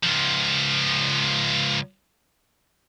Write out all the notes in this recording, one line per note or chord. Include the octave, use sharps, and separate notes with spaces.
C#2 F3